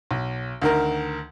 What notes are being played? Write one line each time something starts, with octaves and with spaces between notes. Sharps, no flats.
B1
D2 D#3 A#4